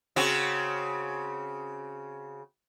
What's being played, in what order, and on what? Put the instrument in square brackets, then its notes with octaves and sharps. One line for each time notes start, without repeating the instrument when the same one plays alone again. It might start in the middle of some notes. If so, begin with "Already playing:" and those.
[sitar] C#3 C4 F#4